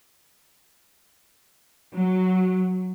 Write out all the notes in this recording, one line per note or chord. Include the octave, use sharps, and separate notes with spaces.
F#3